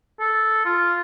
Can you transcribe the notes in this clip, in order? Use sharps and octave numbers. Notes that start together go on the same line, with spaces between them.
A4
F4